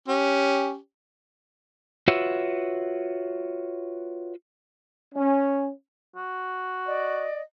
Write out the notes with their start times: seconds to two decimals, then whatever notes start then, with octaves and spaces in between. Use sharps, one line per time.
0.08 C#4 G4
2.08 F4 F#4 B4 C#5 E5 F#5
5.14 C#4
6.16 F#4
6.86 D5 D#5